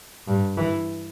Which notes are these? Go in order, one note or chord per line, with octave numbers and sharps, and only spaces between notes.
G2
E3